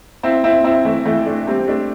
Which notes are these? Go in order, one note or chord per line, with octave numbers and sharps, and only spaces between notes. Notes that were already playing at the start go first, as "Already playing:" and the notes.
C4 E4
C4 E4
C4 E4
E3 A3
E3 A3
A3 D4
G3 C4
C4
A3 D4